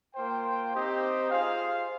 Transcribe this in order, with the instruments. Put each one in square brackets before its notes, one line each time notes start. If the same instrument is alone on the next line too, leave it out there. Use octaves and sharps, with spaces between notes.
[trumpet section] A#3 F4 C5 G5
C4 D#4 G4 C5 D#5
F4 G#4 C5 F5